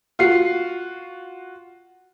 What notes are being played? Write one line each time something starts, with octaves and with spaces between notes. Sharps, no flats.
F4 F#4 C7